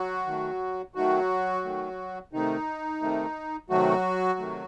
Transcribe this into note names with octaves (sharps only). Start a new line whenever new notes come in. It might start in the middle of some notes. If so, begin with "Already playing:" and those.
Already playing: F#3 F#4
D#3 A3
D#3 F#3 A3 F#4
D#3 A3
C3 D#3 A3 D#4
C3 D#3 A3
C3 D#3 F#3 A3 F#4
C3 D#3 A3